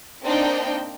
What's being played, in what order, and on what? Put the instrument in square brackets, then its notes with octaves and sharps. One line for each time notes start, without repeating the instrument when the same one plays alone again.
[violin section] A#3 C4 D4 D#4 G5